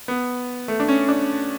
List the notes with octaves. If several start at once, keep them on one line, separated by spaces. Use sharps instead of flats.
B3
A3
D4
C#4
D4